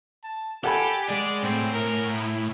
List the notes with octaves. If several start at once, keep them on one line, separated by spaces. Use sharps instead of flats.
A5
G4 A4 F#5 G#5 B5
G#3 G#4 D5
A2 C4
A#4
E4